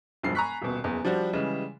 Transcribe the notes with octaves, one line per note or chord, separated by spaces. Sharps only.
E1 G2 F3 C7
G#5 A#5 B5 C#6 F#6 B6
D#1 B2
F#1 E2
F3 G3 D4 F#4
C#3 E3 G3 G#3